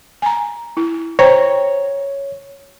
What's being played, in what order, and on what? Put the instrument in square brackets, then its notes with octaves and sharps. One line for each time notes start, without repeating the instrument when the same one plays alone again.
[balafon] G#5 A#5
E4
[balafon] C5 G5 A#5 [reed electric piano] C#5